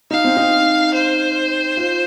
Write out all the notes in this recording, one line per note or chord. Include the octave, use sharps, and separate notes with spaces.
D#4 F5
C4
D#4
C5
F4